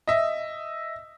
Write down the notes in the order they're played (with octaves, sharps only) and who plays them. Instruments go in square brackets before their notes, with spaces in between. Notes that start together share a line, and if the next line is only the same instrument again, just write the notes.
[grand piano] D#5 E5